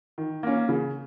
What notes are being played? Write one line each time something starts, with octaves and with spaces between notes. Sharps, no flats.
D#3
A#3 C#4
C#3